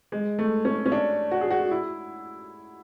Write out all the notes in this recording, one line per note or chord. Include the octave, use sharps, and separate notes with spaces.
G#3
A3
C#4
C#4
D4
F#4
G#4
F#4
E4